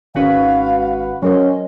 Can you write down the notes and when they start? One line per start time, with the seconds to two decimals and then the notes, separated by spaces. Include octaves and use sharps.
0.15 G#1 D#3 C#4 F#4 B4 F5
1.23 F#3 C#4 A#4 C5 D#5